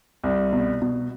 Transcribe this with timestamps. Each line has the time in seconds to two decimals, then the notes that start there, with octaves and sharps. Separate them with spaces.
0.23 C2
0.53 B2
0.82 B2